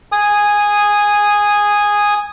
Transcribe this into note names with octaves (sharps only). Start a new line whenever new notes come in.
G#5 D#6